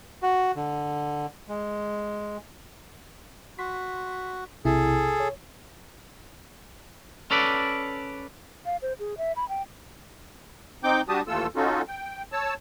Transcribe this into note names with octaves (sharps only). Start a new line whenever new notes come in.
F#4
D3
G#3
F#4 C6 B6
B1 C3 E4 G#4 A4
C#5
C#4 A4 B4 D5
F5
C5
G#4
E5
B5
G5
C4 D#4 G5 D6 G6
G3 D4 F#4 G4 A5 D#6
D#2 E3 A3 F4 A4 E6
C#4 D#4 F4 F#4 A4
G5
C#5 A5 E6